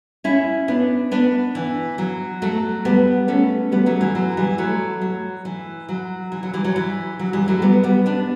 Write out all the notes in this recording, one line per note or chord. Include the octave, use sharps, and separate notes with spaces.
C#4 E4
B3 D4
B3 D4
E3
F#3
F#3 A3
G3 B3
A3 C#4
G3 B3
F#3 A3
E3
F#3
E3 G3
F#3 A3
F#3
E3
F#3
E3
F#3
E3 G3
F#3
E3
F#3
E3 G3
F#3 A3
G3 B3
G3 B3
B3 D4